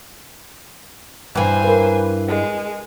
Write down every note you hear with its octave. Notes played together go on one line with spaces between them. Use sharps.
G2 E3 C5 G#5
A#4 B4
G#3